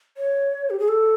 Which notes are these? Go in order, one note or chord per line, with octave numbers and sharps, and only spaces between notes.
C#5
G4
G#4
A4